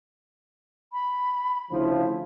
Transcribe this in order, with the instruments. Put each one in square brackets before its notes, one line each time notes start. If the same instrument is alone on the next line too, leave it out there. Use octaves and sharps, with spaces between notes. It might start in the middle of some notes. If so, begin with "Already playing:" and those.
[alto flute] B5
[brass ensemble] D2 C#3 F3 [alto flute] E4